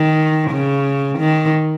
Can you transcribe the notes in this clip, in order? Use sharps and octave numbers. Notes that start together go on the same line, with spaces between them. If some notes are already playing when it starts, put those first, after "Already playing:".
Already playing: D#3
C#3
D#3